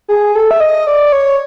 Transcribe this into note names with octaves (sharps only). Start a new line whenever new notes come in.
G#4
A4
E5
D#5
D5
C#5